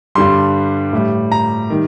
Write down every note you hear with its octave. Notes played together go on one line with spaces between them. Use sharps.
G2 D3 G3 C6
A2 G3
A#5
D#3 G3